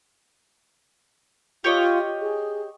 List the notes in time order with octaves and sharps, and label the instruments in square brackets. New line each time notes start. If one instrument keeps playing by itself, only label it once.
[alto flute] F4 [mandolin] G4 C#5 D#5
[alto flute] G#4